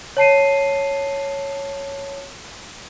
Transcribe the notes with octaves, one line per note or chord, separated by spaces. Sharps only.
C#5 A5 C7 D#7